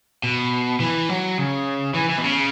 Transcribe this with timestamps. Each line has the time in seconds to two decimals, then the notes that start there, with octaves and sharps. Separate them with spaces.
0.24 B2
0.80 E3
1.09 F#3
1.38 C#3
1.95 E3
2.10 E3
2.18 B2
2.24 C#3